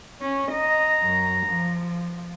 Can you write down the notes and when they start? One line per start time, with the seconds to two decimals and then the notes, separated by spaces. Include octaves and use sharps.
0.21 C#4
0.51 D#5 A#5
1.03 F#2
1.47 F3